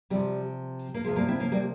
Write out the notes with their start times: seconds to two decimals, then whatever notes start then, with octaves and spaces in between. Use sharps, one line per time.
0.10 C3 F3 G3
0.94 A#3
1.04 C3 F3 G#3
1.16 G3 A#3
1.28 C4 E4
1.40 A#3 C#4
1.52 G3 A#3